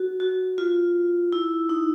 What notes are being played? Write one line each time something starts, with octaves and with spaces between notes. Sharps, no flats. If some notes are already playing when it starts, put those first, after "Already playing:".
Already playing: F#4
F#4
F4
E4
D#4